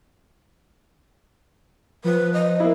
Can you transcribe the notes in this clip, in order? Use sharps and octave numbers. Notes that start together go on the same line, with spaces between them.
F3 B4
D#5
A#3 E4